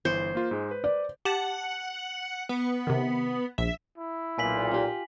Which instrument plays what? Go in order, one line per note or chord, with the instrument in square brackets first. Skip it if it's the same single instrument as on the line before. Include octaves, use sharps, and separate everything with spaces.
[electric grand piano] G1 E3 [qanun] C5
[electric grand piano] A#3 F4
G#2 G#3
B4
[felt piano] D5
[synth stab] G4 A5 [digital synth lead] F#5
[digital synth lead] B3
[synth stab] C3 D#3
[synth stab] A#1 [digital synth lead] E5
[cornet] E4
[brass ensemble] B1 A#2 [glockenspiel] G#5 B6 F#7
[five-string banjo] F4 G4